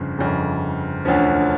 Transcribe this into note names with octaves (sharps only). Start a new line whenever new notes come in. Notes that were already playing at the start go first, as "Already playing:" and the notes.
Already playing: G1 F2 C#3
G1 F2 C#3
E1 D2 D3 F3 C#4